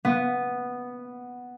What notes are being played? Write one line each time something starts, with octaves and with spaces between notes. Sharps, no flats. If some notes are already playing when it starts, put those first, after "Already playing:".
B3